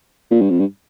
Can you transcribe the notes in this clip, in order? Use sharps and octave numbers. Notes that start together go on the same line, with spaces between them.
A#2
G2
F2
G2